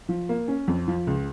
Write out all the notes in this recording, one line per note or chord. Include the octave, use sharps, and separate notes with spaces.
F3
A#3
C#4
F2
F3
C#2